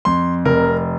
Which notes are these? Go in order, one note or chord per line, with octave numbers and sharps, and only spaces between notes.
F2 C6
F1 A#4